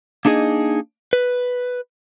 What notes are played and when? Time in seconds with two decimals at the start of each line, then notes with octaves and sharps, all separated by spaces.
0.25 A#3 D4 D#4 G#4 D#5
1.13 B4